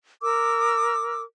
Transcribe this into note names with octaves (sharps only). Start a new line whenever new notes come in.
A#4 D6 E6